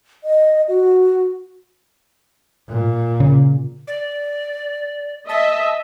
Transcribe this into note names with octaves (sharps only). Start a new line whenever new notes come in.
D#5
F#4
A#2
C#3
D5
D#5 E5 A5